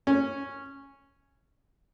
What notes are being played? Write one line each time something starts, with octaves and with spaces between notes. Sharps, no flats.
C#4